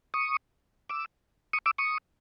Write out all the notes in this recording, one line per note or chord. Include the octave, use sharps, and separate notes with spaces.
C#6 D#6
D6 E6
C#6 D#6
D6 E6
C#6 D#6